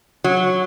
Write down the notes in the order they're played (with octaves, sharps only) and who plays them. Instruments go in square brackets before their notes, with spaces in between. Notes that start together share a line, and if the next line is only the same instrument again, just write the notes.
[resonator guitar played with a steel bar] F#3